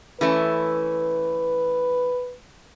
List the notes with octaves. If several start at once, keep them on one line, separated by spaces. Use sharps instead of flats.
E3 A3 C#4 B4